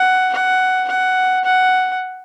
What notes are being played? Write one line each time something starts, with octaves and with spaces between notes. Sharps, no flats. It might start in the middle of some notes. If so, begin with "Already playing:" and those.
Already playing: F#5
F#5
F#5
F#5